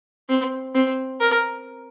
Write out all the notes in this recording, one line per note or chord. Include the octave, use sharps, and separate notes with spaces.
C4
C4
A#4